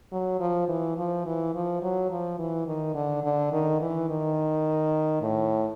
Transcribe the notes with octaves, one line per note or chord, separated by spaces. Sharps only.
F#3
F3
E3
F3
E3
F3
F#3
F3
E3
D#3
D3
D3
D#3
E3
D#3
A2